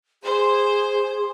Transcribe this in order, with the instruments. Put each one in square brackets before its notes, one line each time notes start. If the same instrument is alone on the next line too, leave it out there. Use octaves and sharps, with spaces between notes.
[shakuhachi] G#4 [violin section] C5